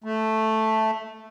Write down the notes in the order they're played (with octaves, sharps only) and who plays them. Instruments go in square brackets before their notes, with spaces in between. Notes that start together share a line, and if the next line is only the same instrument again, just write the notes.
[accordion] A3